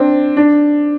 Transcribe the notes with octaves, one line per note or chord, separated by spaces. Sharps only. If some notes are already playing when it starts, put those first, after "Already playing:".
Already playing: C4 D4
D4